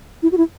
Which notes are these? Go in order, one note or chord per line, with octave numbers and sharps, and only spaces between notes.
E4
F#4
E4